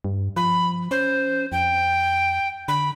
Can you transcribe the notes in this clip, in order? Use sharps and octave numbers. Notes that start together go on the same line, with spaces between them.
G2
F3 B5
C#4 C5
F2 G5
D3 B5